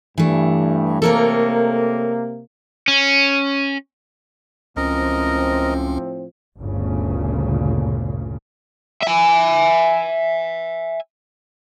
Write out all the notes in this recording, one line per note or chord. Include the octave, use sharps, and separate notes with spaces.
G2 E3 A3
C3 A#3 A4 A#4 C#5
C#4
C#2 A2 F3 C4 C#4 A#4 D#5
G1 D2 A#2 C#3
E5 G#5